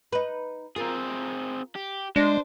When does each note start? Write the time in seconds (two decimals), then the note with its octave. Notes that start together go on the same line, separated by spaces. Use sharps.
0.12 D#4 B4
0.76 C4 F4 G#4 A#4
1.75 G4
2.16 G#3 D4 C5